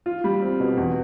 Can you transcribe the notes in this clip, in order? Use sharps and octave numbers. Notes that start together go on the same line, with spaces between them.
F4
G3
C4
B2
E2